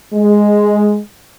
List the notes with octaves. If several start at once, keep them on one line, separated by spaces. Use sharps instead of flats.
G#3